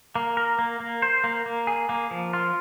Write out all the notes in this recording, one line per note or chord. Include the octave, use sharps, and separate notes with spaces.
A#3
A#4
A#3
A#3
C5
A#3
A#3
G#4
A#3
F3
F4